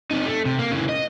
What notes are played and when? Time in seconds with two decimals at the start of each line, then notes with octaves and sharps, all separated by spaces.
0.11 C3 D#4
0.26 A3
0.46 C3
0.59 A#3
0.71 C#3 E3
0.89 D#5